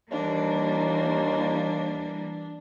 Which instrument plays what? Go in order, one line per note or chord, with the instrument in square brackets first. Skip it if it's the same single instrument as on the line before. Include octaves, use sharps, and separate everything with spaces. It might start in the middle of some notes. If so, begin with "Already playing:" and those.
[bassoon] D#2 [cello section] E3 G3 A#3 [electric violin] D4